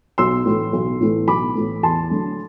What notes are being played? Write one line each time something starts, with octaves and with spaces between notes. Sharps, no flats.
B1 C6 E6
A2 E3 A3
B1
A2 E3 A3
B1 B5 D6
A2 E3 A3
E2 A5 C6
D3 F#3 A3